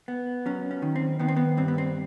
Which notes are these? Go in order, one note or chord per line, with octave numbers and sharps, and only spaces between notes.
B3
F#3 C#4
C#4
D#3
C4
D#3 B3
C4
B3
G2 C4
B3
C4